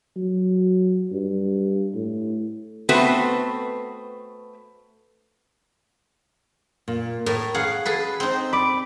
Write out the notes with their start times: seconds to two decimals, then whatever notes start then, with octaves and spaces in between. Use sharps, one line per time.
0.16 F#3
1.12 G2
1.95 A2
2.89 A3 B3 C4 F#4 B4
6.88 A#2
7.26 A2 A#4
7.54 C#4 G#4 F5 F#5
7.86 G#4 A4 B4
8.20 C4 D#4
8.53 D5 B5 D6